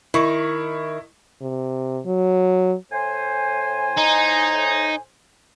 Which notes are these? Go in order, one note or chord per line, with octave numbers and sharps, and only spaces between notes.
D#3 E4 C#6
C3
F#3
A2 C5 G#5
D#4